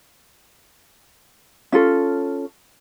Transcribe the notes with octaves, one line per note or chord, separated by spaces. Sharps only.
C#4 F4 A4